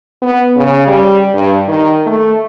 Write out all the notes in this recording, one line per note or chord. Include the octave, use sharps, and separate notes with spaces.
B3
C#3
G3
G2
D#3
A3